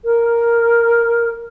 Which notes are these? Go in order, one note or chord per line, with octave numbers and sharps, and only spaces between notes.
A#4